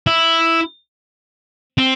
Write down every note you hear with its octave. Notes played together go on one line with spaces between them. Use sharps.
E4
C4